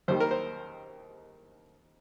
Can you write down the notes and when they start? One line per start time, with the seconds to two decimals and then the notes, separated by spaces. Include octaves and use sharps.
0.08 D#2 D#3 G3 C5
0.20 A#4
0.31 C5